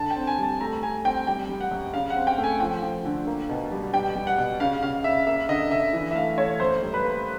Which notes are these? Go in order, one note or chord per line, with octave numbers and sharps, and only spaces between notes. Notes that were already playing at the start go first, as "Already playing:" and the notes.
Already playing: D3 A5
G5
C4
G#5
G3
A5
A3 A#5
A3 G#5
C4 G5
G3 G5
G3
F#5
F#2
C#3 F5
F#5
C4
G5
A3
G#5
F3 G5
F3
D3
A#3
B2
G3
G3 G5
G3
F#5
B2
C#3 F5
C#3 F5
C#3 E5
A#3 E5
D3 D#5
D3 E5
E3
E5
A3 F5
A3 C#5
F#2 C5
G3
B4
A#3